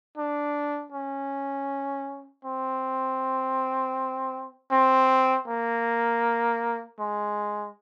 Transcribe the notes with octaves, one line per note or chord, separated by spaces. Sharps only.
D4
C#4
C4
C4
A#3
G#3